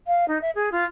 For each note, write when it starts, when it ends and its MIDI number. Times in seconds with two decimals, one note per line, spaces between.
0.06 0.24 77
0.28 0.38 63
0.41 0.50 76
0.55 0.69 68
0.71 0.84 65